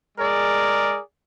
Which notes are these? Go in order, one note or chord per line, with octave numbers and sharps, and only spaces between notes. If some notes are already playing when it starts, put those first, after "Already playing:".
G#3 G#4 A#4 D5